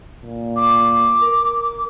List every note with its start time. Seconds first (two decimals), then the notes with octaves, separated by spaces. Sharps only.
0.23 A#2
0.56 D6
1.21 A#4